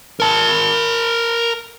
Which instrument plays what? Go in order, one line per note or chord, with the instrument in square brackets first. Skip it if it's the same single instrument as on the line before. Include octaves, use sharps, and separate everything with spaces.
[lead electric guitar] A#4 A5